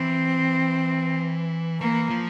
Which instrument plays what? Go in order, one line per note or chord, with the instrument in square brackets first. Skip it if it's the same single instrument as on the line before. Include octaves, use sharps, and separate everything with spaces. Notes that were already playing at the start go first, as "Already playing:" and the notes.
Already playing: [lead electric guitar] E3 [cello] C4
[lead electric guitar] E3 [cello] A#3
[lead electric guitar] F3